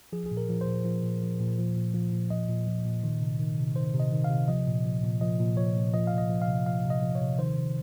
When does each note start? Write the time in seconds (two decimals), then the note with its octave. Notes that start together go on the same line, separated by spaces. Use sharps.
0.12 F3 G#4
0.26 G#4
0.31 A#2
0.37 A#4
0.49 F3
0.61 C5
0.68 A#2
0.85 F3
1.03 A#2
1.22 F3
1.40 A#2
1.58 F3
1.76 A#2
1.94 F3
2.12 A#2
2.30 F3 D#5
2.49 A#2
2.67 F3
2.85 A#2
3.04 D#3
3.21 C3
3.40 D#3
3.58 C3
3.76 D#3 C5
3.94 C3
3.99 D#5
4.12 D#3
4.24 F5
4.30 C3
4.48 F3 D#5
4.67 A#2
4.85 F3
5.02 A#2
5.21 F3 D#5
5.39 A#2
5.57 F3 C#5
5.75 A#2
5.93 F3 D#5
6.07 C3 F5
6.18 D#5
6.29 F3
6.42 F5
6.48 C3
6.66 F3 F5
6.84 C3
6.90 D#5
7.02 F3
7.15 C#5
7.21 C3
7.39 D#3 C5
7.57 C3